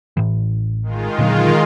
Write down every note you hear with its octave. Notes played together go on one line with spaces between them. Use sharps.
A1 A2 E3
D#3 G#3 F4
A#2 D3 F#3